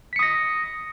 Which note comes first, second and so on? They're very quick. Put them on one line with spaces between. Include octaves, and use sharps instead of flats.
B6 C#7 D#6 A#6